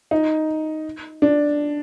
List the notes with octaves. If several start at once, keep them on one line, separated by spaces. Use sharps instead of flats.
D#4
D4